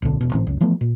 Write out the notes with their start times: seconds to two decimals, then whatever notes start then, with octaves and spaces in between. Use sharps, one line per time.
0.02 D1 B1 B2 D3
0.21 E1 B2
0.33 G1 A2 E3 C4
0.47 F#1 C#2
0.61 E3 F3 A3 B3
0.81 A#2